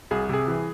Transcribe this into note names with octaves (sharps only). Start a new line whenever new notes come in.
C2 G#4
C3 G#4
E3